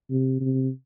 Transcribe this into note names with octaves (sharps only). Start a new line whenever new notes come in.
C3
C3